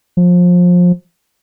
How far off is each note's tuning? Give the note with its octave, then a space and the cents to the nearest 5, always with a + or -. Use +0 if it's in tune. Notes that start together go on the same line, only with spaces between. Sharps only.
F3 +25